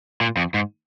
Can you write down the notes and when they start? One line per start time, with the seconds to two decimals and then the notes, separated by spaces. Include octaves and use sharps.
0.21 A#2
0.37 F2
0.54 G#2